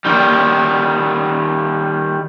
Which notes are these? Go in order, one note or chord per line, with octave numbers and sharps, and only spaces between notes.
D#3 G3